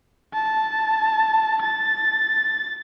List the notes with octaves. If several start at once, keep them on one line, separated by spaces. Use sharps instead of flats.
A5
A6